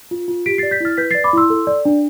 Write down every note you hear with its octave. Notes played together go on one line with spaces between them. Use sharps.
F4
F4
G4 B6 D7
A6 C7
D5
G6 B6
E4 F6 A6
B4 G6 B6
A6 C7
D5
B5 D6
E4 C6 E6
A4
D5
D4